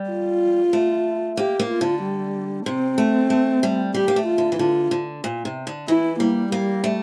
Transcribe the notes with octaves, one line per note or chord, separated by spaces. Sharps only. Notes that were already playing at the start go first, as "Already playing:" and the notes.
Already playing: G3
F4
A3
A#3 G4
A#3
F4
D3
G3
C3 C4
A3
A3
G3
G3 G4
A#3
A3
F4
D3
E3
D3 F4
D3
A#2
C3
D3
E3 E4
G3 A#3
G3 A#3
A3